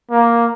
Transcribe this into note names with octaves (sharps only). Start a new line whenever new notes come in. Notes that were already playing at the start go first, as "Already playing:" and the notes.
A#3